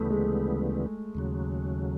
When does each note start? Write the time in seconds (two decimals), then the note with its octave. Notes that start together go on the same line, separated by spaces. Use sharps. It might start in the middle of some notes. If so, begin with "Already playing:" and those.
Already playing: D2 C#3 E3 G3 A3 B3
0.10 G#3
1.15 D#2 C#3 F#3